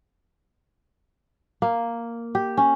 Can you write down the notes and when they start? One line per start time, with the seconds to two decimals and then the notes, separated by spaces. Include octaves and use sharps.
1.62 A#3
2.35 G4
2.57 C#4